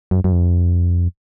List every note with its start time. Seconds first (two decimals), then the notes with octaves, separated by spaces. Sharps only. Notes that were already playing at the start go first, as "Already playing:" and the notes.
0.11 F#2
0.24 F#2
0.32 F2